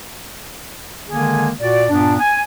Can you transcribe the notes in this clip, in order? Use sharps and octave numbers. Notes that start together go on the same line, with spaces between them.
D3 D#3 G#3 A#3 G#4
A#2 F#4 D5
G2 A#2 B3 D4
G#5